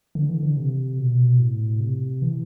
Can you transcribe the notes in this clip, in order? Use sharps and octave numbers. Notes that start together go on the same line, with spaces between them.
D3
E3
D3
C3
B2
A2
C3
E3